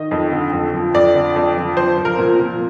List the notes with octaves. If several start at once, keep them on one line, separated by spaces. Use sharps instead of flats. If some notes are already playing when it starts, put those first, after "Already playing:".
Already playing: D#3 D#5
F2
D3
F2
F3
F2 D5
D3
F2
F3
F3 C5
F3
A#4
A#2
A#2